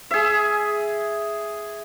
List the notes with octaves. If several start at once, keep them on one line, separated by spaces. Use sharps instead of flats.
G#4 E5